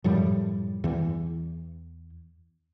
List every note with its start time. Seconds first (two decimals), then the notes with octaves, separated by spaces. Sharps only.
0.04 F#2 A2 F3 G3
0.84 E2 E3